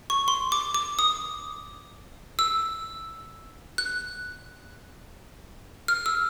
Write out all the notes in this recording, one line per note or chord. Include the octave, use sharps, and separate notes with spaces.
C#6
C6
D6
D6
D#6
E6
F#6
F6
E6